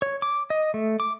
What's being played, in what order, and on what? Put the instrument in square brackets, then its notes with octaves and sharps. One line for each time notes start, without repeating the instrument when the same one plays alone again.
[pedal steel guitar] C#5
D6
D#5
A3
D6